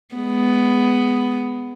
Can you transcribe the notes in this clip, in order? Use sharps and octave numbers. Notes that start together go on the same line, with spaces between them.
G#3 B3